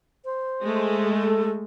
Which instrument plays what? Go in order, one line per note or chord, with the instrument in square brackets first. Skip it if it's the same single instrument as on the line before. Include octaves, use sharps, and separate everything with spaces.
[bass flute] C5
[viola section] G#3 A3
[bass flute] A4